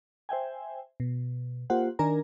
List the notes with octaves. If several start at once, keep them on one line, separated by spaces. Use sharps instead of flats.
C5 E5 G5 G#5
B2
A#3 F4 G4 C5 F#5
D#3 D4 A#4 G#5 A#5